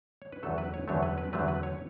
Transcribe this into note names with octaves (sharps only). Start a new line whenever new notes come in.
C#5
B4
E2 D3 F#3 A3 A4
B4
C#5
E2 D3 F#3 A3 C#5
B4
B4
E2 D3 F#3 A3 B4
B4
C#5